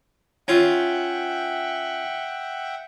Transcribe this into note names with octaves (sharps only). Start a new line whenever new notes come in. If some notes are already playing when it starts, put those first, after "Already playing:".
C#4 F4 E5 F#5 G5